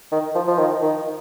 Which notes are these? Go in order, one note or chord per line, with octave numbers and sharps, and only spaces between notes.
D#3
F3
F3
D#3
D#3